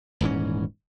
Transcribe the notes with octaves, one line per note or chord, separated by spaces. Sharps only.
D#1 G#2 E3 C#4